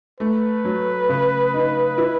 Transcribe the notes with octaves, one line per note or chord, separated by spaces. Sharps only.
A3 B4
F#3
C#3
D#4
E4